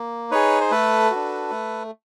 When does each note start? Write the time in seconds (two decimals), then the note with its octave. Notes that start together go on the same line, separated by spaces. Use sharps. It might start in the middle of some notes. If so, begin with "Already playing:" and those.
Already playing: A#3
0.31 D#4 G#4 B4 C#5
0.61 C5
0.71 A3 A4 B4
1.11 D4 F#4
1.51 A3